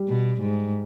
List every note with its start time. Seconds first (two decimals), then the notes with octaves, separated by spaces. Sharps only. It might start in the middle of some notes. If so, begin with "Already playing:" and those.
Already playing: G3
0.08 B2
0.41 G#2